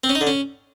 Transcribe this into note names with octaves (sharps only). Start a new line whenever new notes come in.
C4
C#4
D#4
D3
C#4